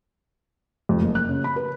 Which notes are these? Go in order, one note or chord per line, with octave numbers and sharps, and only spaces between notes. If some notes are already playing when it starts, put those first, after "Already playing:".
F2
F#1
F#6
C#3
B5
B4